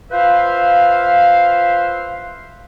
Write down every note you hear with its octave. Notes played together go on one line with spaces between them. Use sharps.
F4 B4 C5 E5 F5